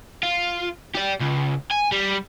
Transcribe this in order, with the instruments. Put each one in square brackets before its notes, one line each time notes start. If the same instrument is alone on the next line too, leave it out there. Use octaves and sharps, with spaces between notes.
[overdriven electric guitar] F4
G4 D5
C#2
G#5
G3